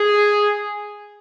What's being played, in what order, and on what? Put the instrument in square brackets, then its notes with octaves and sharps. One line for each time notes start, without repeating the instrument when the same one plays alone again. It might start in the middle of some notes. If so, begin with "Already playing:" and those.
Already playing: [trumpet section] G#4